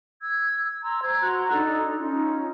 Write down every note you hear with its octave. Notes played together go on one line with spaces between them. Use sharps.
E6 G#6
A#5 C6 E6
C5 G#6
F#4 A#5 C6 F#6
D4 D#4 A4
C#4 D#4 F4